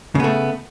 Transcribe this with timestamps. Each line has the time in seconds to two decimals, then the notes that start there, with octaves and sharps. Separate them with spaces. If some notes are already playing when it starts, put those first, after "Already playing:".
0.15 C#3
0.20 B3
0.24 A3